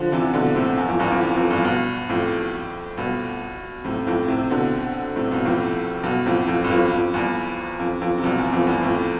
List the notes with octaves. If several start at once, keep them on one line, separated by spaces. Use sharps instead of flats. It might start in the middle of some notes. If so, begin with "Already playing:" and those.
Already playing: D3 F3
C3 E3
B2 D3
A2 C3
E2
F2
E2 G2
F2
E2
F2
E2 G2
G2 B2
F2 A2
G2 B2
A2 C3
F2 A2
A2 C3
B2 D3
A2 C3
G2 B2
F2 A2
G2 B2
F2 A2
F2
G2
F2
F2
E2 G2
F2
F2
C3
G2 B2
E2
F2
E2 G2
F2 A2